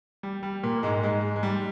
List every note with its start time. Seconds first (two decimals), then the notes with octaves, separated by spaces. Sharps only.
0.23 G3
0.43 G3
0.63 A#2 A#3
0.83 G#2 G#3
1.03 G#2 G#3
1.36 G#3
1.43 G3